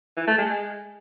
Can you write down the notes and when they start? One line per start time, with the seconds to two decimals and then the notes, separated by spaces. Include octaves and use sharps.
0.17 E3
0.27 A3
0.38 G#3